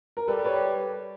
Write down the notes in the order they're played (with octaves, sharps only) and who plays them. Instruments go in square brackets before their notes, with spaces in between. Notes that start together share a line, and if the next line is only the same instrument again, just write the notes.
[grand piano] A#4
[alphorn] G3 [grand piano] A4 B4
[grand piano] B4 C#5